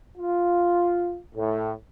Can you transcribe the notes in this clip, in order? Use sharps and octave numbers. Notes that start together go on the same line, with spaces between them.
F4
A2